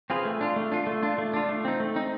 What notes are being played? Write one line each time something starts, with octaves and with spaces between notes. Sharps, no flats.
C4 F4 G#4 B4
A3
D4 F4
A3
D4 F4
A3
D4 F4
A3
D4 F4
A3
C4 D#4
A3
C4 D#4